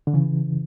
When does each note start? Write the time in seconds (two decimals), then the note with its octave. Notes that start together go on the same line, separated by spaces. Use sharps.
0.07 D3
0.14 C#3 E3